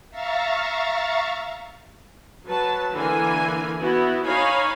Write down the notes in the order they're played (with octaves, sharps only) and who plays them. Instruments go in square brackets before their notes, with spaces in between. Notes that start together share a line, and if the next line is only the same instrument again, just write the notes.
[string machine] E5 F5 A#5 C#6 A6
[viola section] F#3 B4 A5
D3 E3 A#3 G#5
B3 E4 F#4
D#4 C#5 F5 G#5 B5